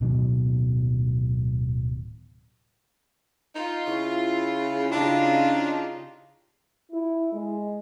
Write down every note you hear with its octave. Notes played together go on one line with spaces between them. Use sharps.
D1 B2 D#3 F#3
D#4 F4
C#3 E4 C#6
C#3 D4 D#4 F4 G4 F5
E4
G#3